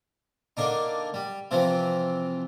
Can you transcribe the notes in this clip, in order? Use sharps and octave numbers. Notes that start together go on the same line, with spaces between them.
D3 A#3 D4 D#4
G3
C3 E3 F3 C4